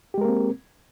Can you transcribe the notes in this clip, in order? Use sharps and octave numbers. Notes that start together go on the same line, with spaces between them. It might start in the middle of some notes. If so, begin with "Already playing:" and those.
G#3 A#3 C4 G4 A#4